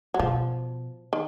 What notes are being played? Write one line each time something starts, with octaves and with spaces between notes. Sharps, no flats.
F#3
B2 F3
D#3